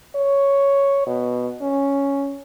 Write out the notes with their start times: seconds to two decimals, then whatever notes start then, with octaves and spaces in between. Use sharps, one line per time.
0.16 C#5
1.07 B2
1.62 C#4